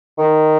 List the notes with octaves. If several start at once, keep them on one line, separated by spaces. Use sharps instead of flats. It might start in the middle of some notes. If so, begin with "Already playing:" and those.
D#3